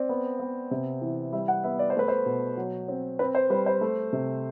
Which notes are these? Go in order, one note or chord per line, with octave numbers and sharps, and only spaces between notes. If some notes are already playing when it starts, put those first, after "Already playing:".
Already playing: C4 D5
B3
B3
C3
E3
G3 E5
F#5
B3 E5
D5
C5
A3 B4
C5
B2
F#3
C4
C4 B4
C5
G3 B4
C5
A3
C3